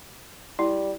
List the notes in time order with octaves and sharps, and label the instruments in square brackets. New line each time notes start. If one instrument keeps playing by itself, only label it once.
[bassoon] G3 [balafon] E4